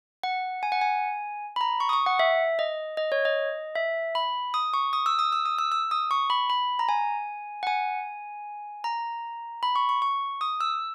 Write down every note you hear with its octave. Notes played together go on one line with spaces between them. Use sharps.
F#5
G#5
F#5
G#5
B5
A#5
C#6
D#6
C#6
F#5
E5
D#5
D#5
C#5
D#5
E5
B5
D#6
C#6
D#6
E6
D#6
E6
D#6
E6
E6
D#6
C#6
B5
B5
A#5
G#5
F#5
G#5
A#5
B5
C#6
C#6
C#6
D#6
E6